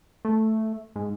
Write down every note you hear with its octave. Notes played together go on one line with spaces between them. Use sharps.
A3
G#2